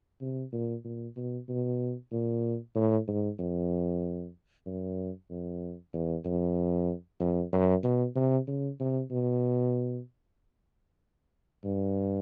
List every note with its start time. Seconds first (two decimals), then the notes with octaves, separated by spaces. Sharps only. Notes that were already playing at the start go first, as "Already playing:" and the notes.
0.21 C3
0.53 A#2
0.85 A#2
1.17 B2
1.49 B2
2.12 A#2
2.75 A2
3.08 G#2
3.39 F2
4.66 F#2
5.30 F2
5.94 E2
6.25 F2
7.20 F2
7.52 F#2
7.84 B2
8.16 C3
8.47 C#3
8.80 C3
9.11 B2
11.65 G2